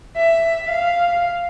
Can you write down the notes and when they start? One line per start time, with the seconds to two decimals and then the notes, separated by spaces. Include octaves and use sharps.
0.16 E5
0.69 F5